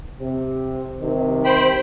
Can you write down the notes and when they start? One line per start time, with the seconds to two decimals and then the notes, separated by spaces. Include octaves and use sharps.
0.20 C3
1.01 G2 C3 D#3
1.45 C5 G5 B5